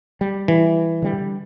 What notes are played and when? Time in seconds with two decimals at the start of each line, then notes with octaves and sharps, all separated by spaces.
0.21 G3
0.48 E3
1.02 D3 G3